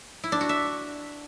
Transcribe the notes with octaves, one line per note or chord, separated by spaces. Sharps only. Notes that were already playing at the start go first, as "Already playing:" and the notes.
E4
D4
F#4
E5